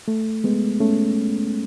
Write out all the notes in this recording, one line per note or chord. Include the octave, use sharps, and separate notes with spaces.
A3
G#3 B3
A3 C#4